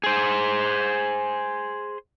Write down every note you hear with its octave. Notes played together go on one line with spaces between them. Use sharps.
G#4 C5